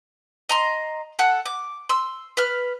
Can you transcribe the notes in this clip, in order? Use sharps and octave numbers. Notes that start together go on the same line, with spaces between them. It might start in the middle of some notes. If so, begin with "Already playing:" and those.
D#5 A#5 C6
A4 F#5 F#6
D6
C6 E6
B4 F6